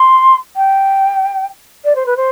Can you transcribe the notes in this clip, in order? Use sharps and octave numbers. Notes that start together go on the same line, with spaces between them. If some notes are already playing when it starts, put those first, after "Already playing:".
Already playing: C6
G5
D5
C5
B4
C5